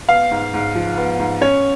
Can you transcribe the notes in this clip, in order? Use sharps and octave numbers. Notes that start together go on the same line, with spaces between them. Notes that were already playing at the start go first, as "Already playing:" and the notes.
B3 F5
G#2
G#2
F3
B3
G#2
C#4 C#5